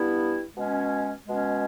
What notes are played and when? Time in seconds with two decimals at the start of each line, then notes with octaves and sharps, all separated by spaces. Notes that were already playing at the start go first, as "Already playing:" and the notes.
Already playing: G2 G3 B3 E4
0.54 B2 G#3 C#4
1.26 B2 G#3 C#4